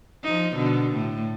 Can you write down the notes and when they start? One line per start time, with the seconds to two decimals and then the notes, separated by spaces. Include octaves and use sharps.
0.24 F3 D#4
0.56 B2 D3
0.93 A2